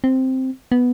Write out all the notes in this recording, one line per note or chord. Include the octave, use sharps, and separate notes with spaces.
C4
B3